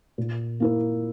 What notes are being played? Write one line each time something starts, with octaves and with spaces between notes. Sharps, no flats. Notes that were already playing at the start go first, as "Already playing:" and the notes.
A#2
A#3 E4 A#4